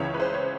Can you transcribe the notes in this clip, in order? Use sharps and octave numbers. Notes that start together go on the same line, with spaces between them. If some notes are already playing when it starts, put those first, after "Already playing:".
Already playing: C#2 C#3 E3 C#5
B4
C5
C#5